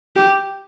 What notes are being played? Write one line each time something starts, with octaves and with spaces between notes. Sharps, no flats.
G4